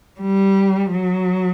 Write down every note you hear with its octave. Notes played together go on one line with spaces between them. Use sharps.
G3
F#3